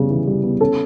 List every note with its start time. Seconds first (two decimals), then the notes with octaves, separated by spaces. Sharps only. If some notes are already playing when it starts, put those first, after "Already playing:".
Already playing: C#3 G3 B3
0.10 E3
0.27 G3
0.44 B3
0.61 C#4 A4